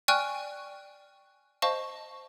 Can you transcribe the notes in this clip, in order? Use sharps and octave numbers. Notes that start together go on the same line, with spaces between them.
D5 G5 G#5 C#6 F6 F#6
C5 D#5 F5 A5 C#6